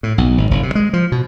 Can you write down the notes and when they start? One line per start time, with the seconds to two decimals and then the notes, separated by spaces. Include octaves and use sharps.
0.03 A2
0.18 B1
0.38 G#1
0.51 F#1
0.63 C3
0.75 G#3
0.93 F3
1.12 B2